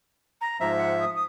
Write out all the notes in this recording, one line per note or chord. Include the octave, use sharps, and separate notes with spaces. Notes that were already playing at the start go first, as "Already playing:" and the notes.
A#5
G#2 F3 E5 A#5
F#5
D#6
D#6